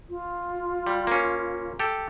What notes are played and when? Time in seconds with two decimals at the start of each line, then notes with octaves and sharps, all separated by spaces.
0.09 F4
0.87 G3
1.07 A#3 C#4
1.79 G4 A4